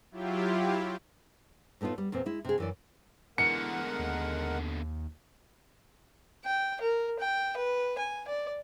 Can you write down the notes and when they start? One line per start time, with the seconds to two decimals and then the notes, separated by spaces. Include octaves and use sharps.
0.11 F#3 E4 F4 G4
1.81 A2 A3 B3 D#4 F4
1.98 G3
2.12 E2 A#2 A#3 C4
2.26 G#3 E4
2.45 C3 G#4
2.58 F#2 E3 D5
3.38 B2 D3 E3 G#3 A#4 F#5 C#7
3.99 D#2
6.45 G5
6.81 A#4
7.20 G5
7.57 B4
7.98 G#5
8.28 D5